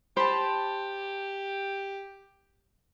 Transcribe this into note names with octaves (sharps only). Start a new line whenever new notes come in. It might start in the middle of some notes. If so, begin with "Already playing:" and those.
G4 C5 A5 B5